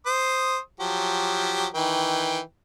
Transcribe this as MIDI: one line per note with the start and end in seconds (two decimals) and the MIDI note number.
0.06 0.59 72
0.06 0.59 87
0.80 1.67 53
0.80 1.67 54
0.80 1.67 67
1.74 2.40 51
1.74 2.40 52
1.74 2.40 79